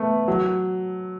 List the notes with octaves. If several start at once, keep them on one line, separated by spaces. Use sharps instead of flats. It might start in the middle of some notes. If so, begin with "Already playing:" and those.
Already playing: A3 B3
F#3